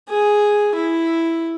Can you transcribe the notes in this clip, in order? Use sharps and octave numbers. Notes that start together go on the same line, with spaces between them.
G#4
E4